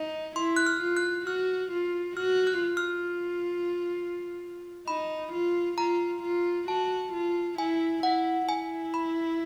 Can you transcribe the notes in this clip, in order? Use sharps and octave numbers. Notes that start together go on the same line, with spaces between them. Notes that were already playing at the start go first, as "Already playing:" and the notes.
Already playing: D#4
E4 C6
F#6
F6
F4
F#6
F#4 F6
F4
F#4 F6
F#6
F4
F6
D#4 B5
F4
F4 A#5
F4
F#4 A5
F4
E4 G#5
E4 F#5
E4 G#5
B5